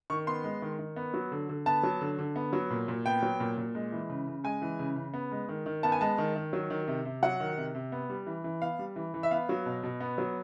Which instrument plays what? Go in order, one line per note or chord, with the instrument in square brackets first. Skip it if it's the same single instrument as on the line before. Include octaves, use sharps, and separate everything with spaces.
[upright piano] D#3 C#6
B3 C6
G#3
D#3
D#3
B3
F#3
D3
D3
B3 A5
F#3
D3
D3
B3
F#3
A#2
A#2
B3 G5
F#3
A#2
A#2
G#3
E3
C#3
C#3
G#3 G#5
E3
C#3
C#3
B3
G#3
D#3
D#3
B3 A5
G#5
G#3 A5
D#3
D#3
F#3
D#3
C3
C3
F#3 F#5
D#3
C3
C3
B3
G3
E3
E3
B3 F5
G3
E3
E3
E5
B3 F5
F#3
B2
B2
B3
F#3